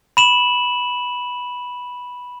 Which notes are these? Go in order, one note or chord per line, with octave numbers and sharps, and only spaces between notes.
B5 E7 F#7